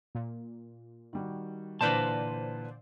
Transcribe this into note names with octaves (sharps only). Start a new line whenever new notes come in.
A#2
D#3 G3 F#4
A#2 D3 E3 B4 C5 D5 A5